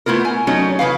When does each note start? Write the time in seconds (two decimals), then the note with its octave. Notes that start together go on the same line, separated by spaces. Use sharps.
0.06 A3 B3 E4 F4 A#4
0.25 G#5
0.47 F#3 A3 C#4 D#4
0.79 C#3 E3 B4 F5